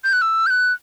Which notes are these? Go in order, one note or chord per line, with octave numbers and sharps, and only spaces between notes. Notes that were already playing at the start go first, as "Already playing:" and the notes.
G6
F#6
E6
G6
F#6